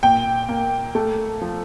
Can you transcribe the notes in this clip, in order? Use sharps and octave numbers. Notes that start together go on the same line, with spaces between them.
A#2 G5
A#3
A3
F3